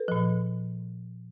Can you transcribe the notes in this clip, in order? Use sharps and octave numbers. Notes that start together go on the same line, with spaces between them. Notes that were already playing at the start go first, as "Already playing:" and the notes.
Already playing: A4 B4
A#2 F3